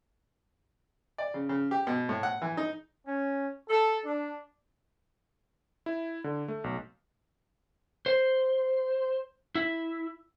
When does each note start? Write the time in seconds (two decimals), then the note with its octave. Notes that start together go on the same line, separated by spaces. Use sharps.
1.18 D5
1.34 C#3
1.49 C#3
1.71 G4
1.87 B2
2.09 A2
2.23 F#5
2.42 E3
2.57 D#4
3.06 C#4
3.69 A4
4.05 D4
5.86 E4
6.24 D3
6.48 A3
6.64 B1
8.06 C5
9.55 E4